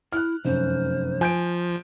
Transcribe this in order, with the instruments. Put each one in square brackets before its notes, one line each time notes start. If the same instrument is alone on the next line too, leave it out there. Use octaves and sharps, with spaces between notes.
[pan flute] E4 [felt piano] F6 F#6
[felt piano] F1 F#2 [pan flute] C5
[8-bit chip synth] F3 [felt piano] G#5 G6 D7